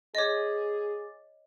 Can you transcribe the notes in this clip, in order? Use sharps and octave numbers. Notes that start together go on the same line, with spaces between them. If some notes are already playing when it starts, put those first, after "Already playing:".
G#4 C#5 D#5 D6 A6